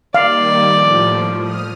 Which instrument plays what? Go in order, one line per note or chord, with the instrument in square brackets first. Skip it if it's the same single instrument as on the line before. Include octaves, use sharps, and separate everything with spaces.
[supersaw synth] D#3 G3 A#3 [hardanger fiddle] D5 [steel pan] F5
[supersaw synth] A2 F3
D#6 F6